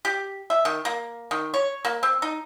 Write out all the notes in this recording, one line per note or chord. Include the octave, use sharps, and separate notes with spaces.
G4
E5
D#3
A#3
D#3
C#5
A#3
C4
D#4